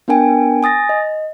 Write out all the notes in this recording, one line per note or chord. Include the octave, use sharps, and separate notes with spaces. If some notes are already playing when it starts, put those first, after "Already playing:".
B3 D4 A#4 G5 G#5
G#5 D#6 A6 A#6
D#5